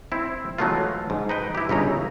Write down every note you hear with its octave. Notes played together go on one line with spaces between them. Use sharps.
C4 E4
E3 F#3 G#3 A3 B3 F4
G#2
D#4 B4 G5
E4 G4
G1 C#3 D#4 A#5